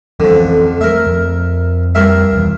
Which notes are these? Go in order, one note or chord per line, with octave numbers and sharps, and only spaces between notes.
F2 D3 E3 C4 C#4
A3 A#4 E5
F2 F3
G2 A#4 E5
E1 E3